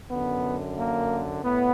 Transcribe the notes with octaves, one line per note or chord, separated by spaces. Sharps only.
F#2 D3 B3
A#3
A2 B3